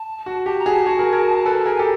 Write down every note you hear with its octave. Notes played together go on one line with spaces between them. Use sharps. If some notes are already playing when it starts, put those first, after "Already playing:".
Already playing: A5
F#4
G4 A5
A#5
F#4 G#4
A5
F#4 G#4
G#4 A#4
G#4 A#4
A4 B4
G#4 A#4 A5
G#5
G4 A4